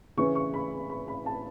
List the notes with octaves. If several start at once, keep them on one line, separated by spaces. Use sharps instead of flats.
C#3 E3 C#4 E4 C#6
C#6
B5
B5
B5
A5